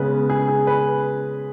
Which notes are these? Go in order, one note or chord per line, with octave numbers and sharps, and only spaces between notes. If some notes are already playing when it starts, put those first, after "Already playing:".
Already playing: C#3 G#3 B3 B4
G#4
G#4
B4